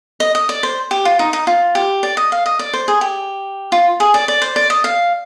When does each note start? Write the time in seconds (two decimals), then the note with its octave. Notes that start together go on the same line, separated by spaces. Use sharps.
0.20 D#5
0.35 D#5
0.49 D5
0.63 C5
0.91 G4
1.05 F4
1.19 D#4
1.33 D#4
1.47 F4
1.75 G4
2.03 D5
2.17 D#5
2.32 F5
2.46 D#5
2.59 D5
2.73 C5
2.88 G#4
3.01 G4
3.72 F4
4.00 G#4
4.14 D5
4.28 D5
4.42 C5
4.56 D5
4.70 D#5
4.84 F5